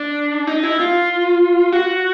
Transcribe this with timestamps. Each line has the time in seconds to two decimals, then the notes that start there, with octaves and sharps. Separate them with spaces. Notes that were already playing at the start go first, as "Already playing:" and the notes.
Already playing: D4
0.47 D#4
0.63 E4
0.80 F4
1.72 F#4